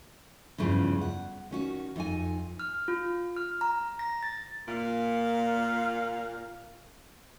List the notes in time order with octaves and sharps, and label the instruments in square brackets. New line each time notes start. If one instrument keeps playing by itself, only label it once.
[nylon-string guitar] E2 G2 C#3 E3 F3
F#5
D#3 C#4 F#4
F2 D#4 G#5
[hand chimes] F6
F4
F6
A#5
A#6
A6
[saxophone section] A#2 F5